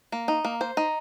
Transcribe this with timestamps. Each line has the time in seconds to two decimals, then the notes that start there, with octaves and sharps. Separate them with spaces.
0.12 A#3
0.28 D#4
0.45 A#3
0.61 C5
0.77 D#4